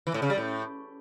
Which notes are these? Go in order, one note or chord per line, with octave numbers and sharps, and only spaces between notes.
E3
A2
C#3
G3
A2